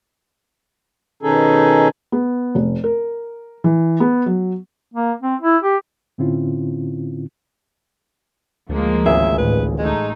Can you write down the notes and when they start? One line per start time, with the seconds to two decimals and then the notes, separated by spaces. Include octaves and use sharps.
1.23 B2 D#3 C#4 D#4 G#4 A4
2.12 B3
2.55 F1
2.84 A#4
3.64 E3
4.00 B3
4.26 F#3
4.94 A#3
5.22 C4
5.41 E4
5.63 G4
6.18 A2 D3 C4 C#4 E4 F4
8.69 D2 F3 G#3 A#3
9.06 G#1 C#2 G#4 E5
9.38 A1 B4
9.78 G#3 A3 D#4